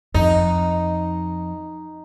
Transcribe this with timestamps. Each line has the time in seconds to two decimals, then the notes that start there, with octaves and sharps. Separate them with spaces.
0.14 F2 D#4